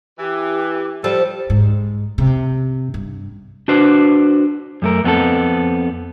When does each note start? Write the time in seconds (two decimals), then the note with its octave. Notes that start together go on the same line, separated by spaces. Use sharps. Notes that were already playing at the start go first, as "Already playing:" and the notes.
0.19 E3 G4
1.04 F3 G3 A4
1.50 G#2
2.18 C3
2.94 G2
3.68 D4 F#4 B4 C5
4.82 F#2 A3 A#4
5.04 F2 B3 C4 F4 A4